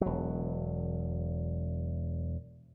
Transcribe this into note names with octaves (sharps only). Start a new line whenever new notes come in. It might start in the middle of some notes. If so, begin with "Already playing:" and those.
E1 F#3